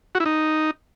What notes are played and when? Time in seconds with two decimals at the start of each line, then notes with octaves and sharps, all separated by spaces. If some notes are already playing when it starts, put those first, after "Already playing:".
0.15 F#4
0.20 E4
0.26 D#4